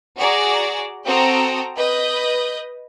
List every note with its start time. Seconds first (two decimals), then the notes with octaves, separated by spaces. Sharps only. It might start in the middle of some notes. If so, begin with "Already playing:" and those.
0.17 F#4 G#4 D5 A#5
1.05 C4 F#4 A4 G5 A#5 D#6
1.77 B4 D#5 D#6 G6